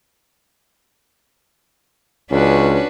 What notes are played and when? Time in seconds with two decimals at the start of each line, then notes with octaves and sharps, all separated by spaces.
2.31 C#2 C#4 D4 F#4 B4